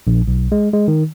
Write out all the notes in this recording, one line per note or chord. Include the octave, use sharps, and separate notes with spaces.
A#1
B1
G#3
G#3
D#3